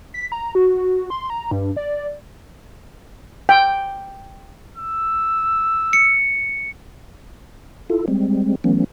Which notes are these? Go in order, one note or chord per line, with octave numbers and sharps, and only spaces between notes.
B6
A#5
F#4
C6
A#5
G2
D5
G5
E6
C#7
E4 F4 A4
G3 G#3 C4
E3 F#3 A3 B3 C#4